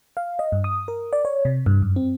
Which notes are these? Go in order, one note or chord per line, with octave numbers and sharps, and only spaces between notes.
F5
D#5
G2
D#6
A#4
D5
C#5
C3
G2
F#2
C4